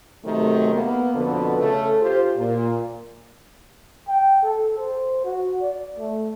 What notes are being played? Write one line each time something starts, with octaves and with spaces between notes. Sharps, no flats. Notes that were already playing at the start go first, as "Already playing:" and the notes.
C3 D#3 F#3 A3
A#3 B3
F2 B2 D3 A4 B4
C#3 A3 A4
F4 G4 C5
A#2
G5
A4
C5
F#4
D5
A3